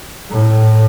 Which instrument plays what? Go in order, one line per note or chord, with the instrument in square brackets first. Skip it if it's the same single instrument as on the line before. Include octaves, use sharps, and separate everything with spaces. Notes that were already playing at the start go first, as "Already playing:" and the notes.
[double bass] A2